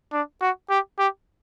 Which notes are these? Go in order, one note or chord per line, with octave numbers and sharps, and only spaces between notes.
D4
F#4
G4
G4